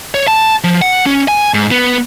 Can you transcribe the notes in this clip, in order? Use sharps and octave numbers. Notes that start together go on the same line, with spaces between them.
C#5
A5
F3
F#5
C#4
G#5
G#2
B3